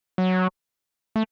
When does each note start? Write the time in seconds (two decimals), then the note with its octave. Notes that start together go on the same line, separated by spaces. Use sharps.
0.18 F#3
1.16 A3